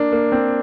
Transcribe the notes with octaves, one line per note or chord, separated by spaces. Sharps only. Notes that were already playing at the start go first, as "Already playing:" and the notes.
Already playing: A#3 D4
A#3
C4